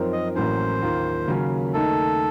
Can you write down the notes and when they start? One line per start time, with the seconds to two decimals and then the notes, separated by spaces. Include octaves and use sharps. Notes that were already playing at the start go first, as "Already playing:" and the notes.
Already playing: F#2 F3 C4 D#4 A#4
0.12 D#5
0.35 A1 A2 F#3 A#3 C#4 C5
0.81 D#2 D#3 A#3 F4
1.27 D#2 C#3 F#3 A#3 C#4
1.73 D#2 D#3 A3 D#4 A4